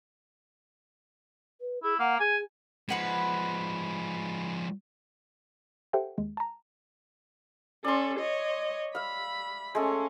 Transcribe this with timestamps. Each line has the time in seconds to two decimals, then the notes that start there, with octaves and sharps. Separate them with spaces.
1.61 B4
1.83 E4 G#4
1.99 A#3 F#5
2.20 G#4 G#5
2.89 F3 G#3 B4 F#5 B5
5.93 G4 A4 C5 E5 F#5 G5
6.18 D#2 G#3
6.37 A5 A#5
7.84 C#4 A4 D5 C6
8.19 C#5 D#5
8.95 E5 F5 B5
9.75 G#3 A3 C#4